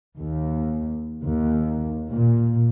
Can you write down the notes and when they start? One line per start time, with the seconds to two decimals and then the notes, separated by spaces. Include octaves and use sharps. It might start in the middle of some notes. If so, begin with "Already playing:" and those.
0.20 D#2
1.25 D#2
2.10 A#2